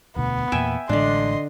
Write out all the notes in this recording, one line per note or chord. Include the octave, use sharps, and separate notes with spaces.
E1 D2 B2 B3
E2 A#2 A#3 E5 G5 G#5
A1 A2 D3 G#3 D4 D#5 C6